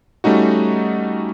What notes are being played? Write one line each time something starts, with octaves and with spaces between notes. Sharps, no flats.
G3 A3 C#4 D#4 F#4